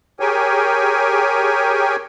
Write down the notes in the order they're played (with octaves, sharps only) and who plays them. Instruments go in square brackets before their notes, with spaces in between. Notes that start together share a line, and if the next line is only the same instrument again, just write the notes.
[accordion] G4 G#4 A#4 C#5 G5 G#5